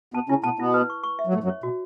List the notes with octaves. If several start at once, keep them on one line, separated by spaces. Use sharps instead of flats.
B2 B3 A5
C#3 C#4 E4
B2 B3 A5
B2 B3 E4
B4
C#6
C#6
E5
F#3
A2 A3 C#5
F#2 F#3
C#5
B2 F#4